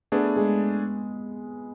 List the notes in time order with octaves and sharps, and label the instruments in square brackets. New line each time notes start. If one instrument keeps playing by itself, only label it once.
[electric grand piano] A3 D4 G#4 [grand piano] B3
[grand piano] G#3